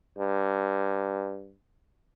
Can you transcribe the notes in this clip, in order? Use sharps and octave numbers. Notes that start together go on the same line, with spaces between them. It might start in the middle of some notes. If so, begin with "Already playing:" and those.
G2